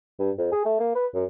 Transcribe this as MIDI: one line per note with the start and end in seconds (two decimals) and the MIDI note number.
0.19 0.31 43
0.38 0.51 41
0.52 0.64 68
0.65 0.77 57
0.80 0.94 58
0.95 1.07 71
1.14 1.25 42